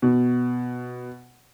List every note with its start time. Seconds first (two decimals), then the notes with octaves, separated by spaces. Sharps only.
0.02 B2